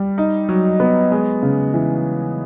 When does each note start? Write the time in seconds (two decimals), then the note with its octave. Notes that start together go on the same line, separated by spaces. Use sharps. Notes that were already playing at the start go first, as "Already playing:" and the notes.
Already playing: G3
0.18 D#4
0.49 F#3
0.80 B3
1.12 G#3
1.42 C#3
1.74 E3